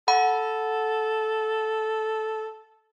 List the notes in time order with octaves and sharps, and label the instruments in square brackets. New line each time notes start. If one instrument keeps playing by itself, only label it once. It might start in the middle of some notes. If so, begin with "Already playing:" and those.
[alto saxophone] A4 [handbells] F#5 B5